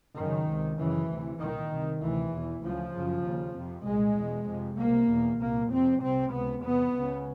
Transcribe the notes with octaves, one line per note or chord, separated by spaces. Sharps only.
F#2 D#3
C#3
C#2 C3
F#2 C#3 E3
D2 C3
C2 A#2 D#3
C2 C3
D2 C3 E3
E2 B2
D2 C#3 F3
F#2 C#3
D#2 C#3
F2 C3
C2 A#2 G#3
E2 B2
F2 C3
C2 C3 A#3
E2 B2
C2 A#2 A#3
F2 C3 C4
C2 C3 C4
C#2 C3 B3
E2 C3 B3
C#2 C#3